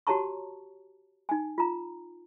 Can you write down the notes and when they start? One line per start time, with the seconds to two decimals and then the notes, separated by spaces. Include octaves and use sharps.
0.07 F#4 G4 C#5 A5 A#5 C#6
1.29 D#4 G#5
1.58 F4 A#5